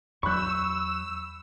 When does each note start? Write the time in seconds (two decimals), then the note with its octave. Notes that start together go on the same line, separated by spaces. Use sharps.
0.23 E2 F#3 B5 C#6 E6 F#6 G6